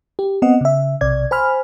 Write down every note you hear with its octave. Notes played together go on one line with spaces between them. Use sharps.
G4
B3 C4 D#5 F#5
C#3 E5
B1 C3 D5 G#6
C5 G#5 B5 F6